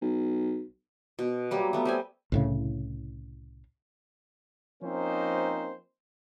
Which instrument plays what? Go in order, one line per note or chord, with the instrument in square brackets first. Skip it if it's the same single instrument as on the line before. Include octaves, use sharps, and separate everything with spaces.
[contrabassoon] B1
[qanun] B2
F#3 G3 A#3
A3 B3
G3 C4 G#5
[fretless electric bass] C2 A2 C#3
[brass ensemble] F3 A#3 C4 C#4 D#4 C5